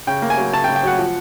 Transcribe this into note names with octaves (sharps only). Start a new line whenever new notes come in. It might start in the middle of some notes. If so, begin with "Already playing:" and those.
C#3 G5
A#3
G#5
F#3
C#3 A5
G5
C#3
G5
F#3 F#5
F3